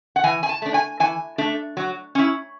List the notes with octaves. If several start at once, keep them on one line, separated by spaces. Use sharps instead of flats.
F#5
E3 G#5
G#5
A5
A3 D4
G#5
E3 G#5
A3 D4
F#3
C#4 E4